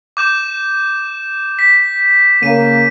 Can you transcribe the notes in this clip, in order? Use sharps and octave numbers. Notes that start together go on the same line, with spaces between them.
D6 G6 E7
B6
C#3 A#3 D#7